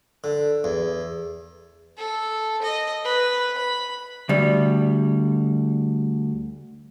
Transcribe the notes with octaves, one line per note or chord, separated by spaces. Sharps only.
D3
E2
A4
D#5
B4
B5
D2 G3